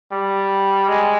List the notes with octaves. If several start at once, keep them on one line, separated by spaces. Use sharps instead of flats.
G3
G#3